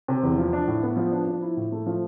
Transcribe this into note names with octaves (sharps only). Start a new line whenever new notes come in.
C3
E2
F3
D4
A2
B3
F3
D4
F3
E4
A2
A3
F3